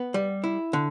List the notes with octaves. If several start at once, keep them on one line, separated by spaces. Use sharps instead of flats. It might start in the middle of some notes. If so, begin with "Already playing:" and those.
Already playing: B3
G3
E4
D3